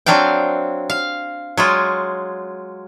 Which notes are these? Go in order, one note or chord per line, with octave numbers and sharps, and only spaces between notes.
F#3 C4 D4 F5 G5
F5
F#3 G#3 F4